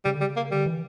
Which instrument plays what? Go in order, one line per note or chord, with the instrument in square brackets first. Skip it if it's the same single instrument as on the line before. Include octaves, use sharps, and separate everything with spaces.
[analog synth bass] C#3 [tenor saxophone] G3
[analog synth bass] D3
[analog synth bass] C#3 [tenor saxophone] G3
[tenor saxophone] A#3
[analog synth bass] D3 [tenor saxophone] G3
[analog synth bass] E3